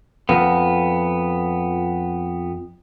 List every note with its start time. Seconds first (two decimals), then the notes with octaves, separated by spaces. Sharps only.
0.29 F2 B3